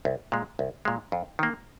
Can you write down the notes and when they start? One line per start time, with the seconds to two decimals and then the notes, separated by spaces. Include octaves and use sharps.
0.05 C2
0.32 A#2 G#3
0.59 C2
0.85 A#2 G#3
1.12 F2
1.39 D#3 A#3